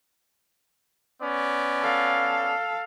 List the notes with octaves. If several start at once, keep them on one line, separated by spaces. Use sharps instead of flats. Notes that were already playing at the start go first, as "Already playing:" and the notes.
B3 C#4 D5
A4 F5